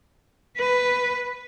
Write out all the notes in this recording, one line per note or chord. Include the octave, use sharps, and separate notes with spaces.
B4